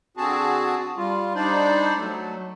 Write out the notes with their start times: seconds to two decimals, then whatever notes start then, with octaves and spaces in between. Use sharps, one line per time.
0.17 D3 C4 F#4 G#4 A5
0.97 G3 F4
1.35 G3 D4 D#4 C5 D5
1.96 F#3 A3